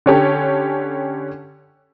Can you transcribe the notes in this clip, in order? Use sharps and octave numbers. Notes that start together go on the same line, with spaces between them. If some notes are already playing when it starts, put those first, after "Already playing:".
D3 C#4 G4 A4